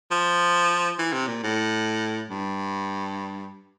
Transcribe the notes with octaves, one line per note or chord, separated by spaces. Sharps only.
F3
E3
C3
A#2
A2
G2